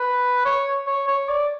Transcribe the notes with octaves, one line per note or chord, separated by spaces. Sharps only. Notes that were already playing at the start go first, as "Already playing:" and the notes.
Already playing: B4
C#5
C#5
C#5
D5